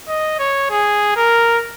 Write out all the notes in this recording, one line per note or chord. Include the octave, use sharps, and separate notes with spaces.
D#5
C#5
G#4
A#4